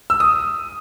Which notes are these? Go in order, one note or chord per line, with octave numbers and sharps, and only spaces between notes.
E6
D#6